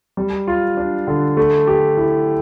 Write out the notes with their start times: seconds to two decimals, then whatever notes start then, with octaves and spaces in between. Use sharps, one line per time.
0.17 G3
0.47 F4
0.77 D4
1.07 D3
1.37 A3
1.67 G4
1.97 E4